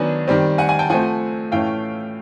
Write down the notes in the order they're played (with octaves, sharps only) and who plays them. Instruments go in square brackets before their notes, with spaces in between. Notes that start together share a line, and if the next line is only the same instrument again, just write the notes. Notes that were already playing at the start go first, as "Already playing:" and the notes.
Already playing: [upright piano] D#3 F#3 B3 D4 G#5
D#3 G3 C4
F#5 G#5
F#5 G#5
G5 A5
F3 A3 C4 F#5 G#5
A2 E3 A3 C#4 F5 G5